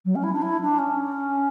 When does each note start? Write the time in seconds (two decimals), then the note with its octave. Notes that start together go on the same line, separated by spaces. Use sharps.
0.05 F#3
0.15 C#4
0.23 E4
0.32 D4
0.42 E4
0.61 D4
0.78 C#4